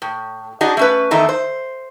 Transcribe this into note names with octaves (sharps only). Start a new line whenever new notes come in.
A2
D4 D#4 F#4 G#4 D#5
A3 C#4 B4
E2 D#3 A3 D#4 E4
C5